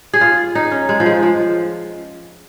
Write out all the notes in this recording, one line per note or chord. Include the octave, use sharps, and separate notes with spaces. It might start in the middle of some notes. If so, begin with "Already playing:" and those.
G#4
F4
D#4
C#4
G#3
F3
G#3
F3